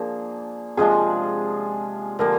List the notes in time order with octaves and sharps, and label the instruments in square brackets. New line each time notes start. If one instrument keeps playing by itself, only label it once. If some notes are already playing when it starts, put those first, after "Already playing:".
Already playing: [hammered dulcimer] F3 A#3 D4 [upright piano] G#4
[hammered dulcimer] C3 F3 G#3 D4 [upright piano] F4 G#4
[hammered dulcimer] D3 F3 A#3 [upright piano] G4 A#4